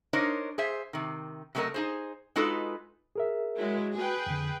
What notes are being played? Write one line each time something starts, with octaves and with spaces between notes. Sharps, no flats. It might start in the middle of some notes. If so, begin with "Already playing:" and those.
D4 D#4 A#4 C5 C#5 D#5
G#4 C5 E5
C3 D#3
C3 F#3 A3 F4 A#4 D#5
D#4 G#4 C5
G#3 D#4 F4 F#4 A4 B4
G#4 A#4 E5
F#3 G#3 E4
F#4 G#4 B4 G5
F2 D3